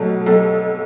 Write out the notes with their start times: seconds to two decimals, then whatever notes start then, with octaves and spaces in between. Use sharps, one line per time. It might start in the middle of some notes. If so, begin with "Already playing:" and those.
Already playing: B1 B2 F#3 A3
0.26 B1 A4